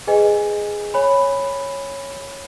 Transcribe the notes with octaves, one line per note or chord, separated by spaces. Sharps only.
G#4 B4 D#5 G#5
C#5 G#5 B5